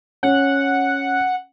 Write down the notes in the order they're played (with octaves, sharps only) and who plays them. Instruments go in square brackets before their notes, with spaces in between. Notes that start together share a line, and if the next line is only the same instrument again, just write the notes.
[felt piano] C#4 [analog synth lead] F#5